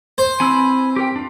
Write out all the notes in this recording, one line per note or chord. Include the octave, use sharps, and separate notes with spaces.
C5
E3 C4 G#5 B5 E6
G4 A#4 G5
D4 F4